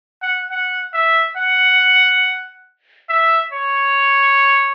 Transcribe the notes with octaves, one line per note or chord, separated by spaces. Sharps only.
F#5
F#5
E5
F#5
E5
C#5